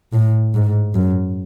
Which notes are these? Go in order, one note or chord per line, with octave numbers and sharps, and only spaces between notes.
A2
G#2
F#2